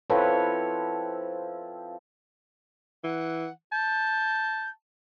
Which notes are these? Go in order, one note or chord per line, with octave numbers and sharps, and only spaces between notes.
F3 C4 E4 A4 B4 C#5
E3 F#5
A5 G6